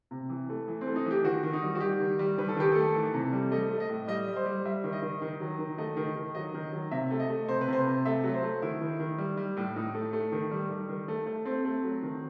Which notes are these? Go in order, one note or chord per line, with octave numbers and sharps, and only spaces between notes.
C3
E3
A3
E3
C4
A3
D#4
E3
G4
D#3 F#4
D#3
D#4
G3
F#4
G3 G4
D#3
G3
D#3 B4
A4
D#3 G4
A3 A4
E3
C3
G3
A3 D#5
A3
D#5
A2
G3 D#5
G3
C5
G3
G3 E5
D#3
D#5
D#3
D#3
F#3
D#3
A3 D#5
D#3
D#3
F#3 D#5
D#3
F#3
C3 E5
A3
D#5
A3
C3 C5
B4
C3 C5
C3
A3 E5
F#3
C5
A3
D#3 E4
D#3
D#3
G3
G3
A2
A2 D#4
A3
A3
D#3
G3
G3
D#3
A3
A3
A3 C4
A3
F#3
D#3